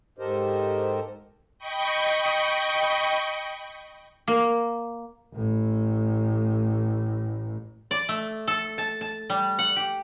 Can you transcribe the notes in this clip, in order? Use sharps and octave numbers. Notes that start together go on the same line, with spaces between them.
G#2 G4 A4 A#4 C5 D#5
D#5 G5 B5 C#6
A#3
A1 A2
D5
A3
A4
A5
A5
G3
F#5
G4